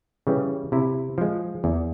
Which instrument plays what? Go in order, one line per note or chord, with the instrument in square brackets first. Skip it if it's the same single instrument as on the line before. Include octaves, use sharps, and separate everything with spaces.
[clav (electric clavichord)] C#3 E3 G3
C3 E4
F3 G#3
E2